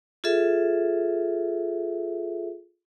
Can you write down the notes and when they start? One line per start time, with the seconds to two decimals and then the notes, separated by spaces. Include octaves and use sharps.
0.24 F4 G#4 A4 E5